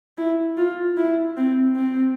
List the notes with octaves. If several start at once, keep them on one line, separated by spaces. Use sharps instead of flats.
E4
F4
E4
C4
C4